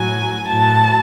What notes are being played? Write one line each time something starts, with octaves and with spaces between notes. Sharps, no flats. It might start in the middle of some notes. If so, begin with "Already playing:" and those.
Already playing: A2 F#3 G#5
A2 F#3 A5